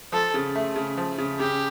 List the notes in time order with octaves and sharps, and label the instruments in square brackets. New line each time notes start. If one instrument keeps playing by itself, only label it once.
[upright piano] F3 [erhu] A4
[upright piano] C#3
A3
C#3
F3
C#3
[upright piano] C#3 [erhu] G4